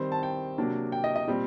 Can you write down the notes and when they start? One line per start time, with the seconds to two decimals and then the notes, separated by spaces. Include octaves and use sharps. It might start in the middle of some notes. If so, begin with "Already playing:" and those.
Already playing: D#3 G3 C4 C5
0.12 A5
0.23 G5
0.58 C3 F#3 A#3 D4
0.92 G5
1.04 D#5
1.16 D#5
1.27 A#2 G3 C4